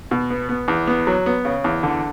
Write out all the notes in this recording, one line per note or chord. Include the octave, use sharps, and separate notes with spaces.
B2
B3
B3
E2
B3
F#3
B3
C#3
E2
D3